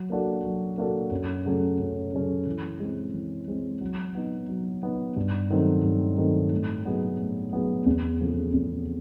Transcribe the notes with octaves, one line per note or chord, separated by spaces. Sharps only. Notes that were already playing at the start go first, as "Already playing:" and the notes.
Already playing: F#3
A#3 D4 F#4 A4
F#3
A#3 D4 F#4 A4
F#2
C#3 F#3 A3 C#4
F#2
C#3 F#3 A3 C#4
E3
G#3 C4
E3
G#3 C4
F#3
B3 D#4
F#3
B3 D#4
G2
D#3 F#3 A3 C4
G2
D#3 F#3 A3 C4
A2
F#3 B3 D#4 G#4
A2
F#3 B3 D#4 G#4
E2
C#3 F3 A3 C4
E2